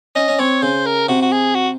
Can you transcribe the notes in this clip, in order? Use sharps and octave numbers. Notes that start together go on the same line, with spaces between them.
C#4 D#5
C#4
C4 C#5
C#3 C5
A#4
C3 F#4
F#4
G#4
F#4